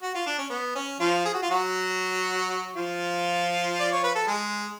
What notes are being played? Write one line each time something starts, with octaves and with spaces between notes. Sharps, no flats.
F#4
F4
D4
C#4
B3
C#4
F3 F4
G#4
F#4
F4
F#3 F#4
F3 F4
D5
C#5
B4
A4
G#3 G#4